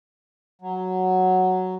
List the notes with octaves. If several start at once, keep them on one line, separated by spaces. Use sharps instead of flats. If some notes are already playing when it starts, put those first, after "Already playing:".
F#3